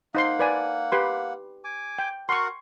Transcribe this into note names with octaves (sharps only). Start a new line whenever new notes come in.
A#3 D#4 C5 F#5 C6
B4 D5 G#5
G4 B4 C6
G#5 D6
G5
F#4 A#4 F#5 C6 C#6